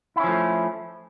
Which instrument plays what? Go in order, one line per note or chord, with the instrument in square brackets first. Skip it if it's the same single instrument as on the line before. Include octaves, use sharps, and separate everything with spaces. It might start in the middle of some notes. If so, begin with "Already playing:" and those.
[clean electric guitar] E4
C#4
F3
A3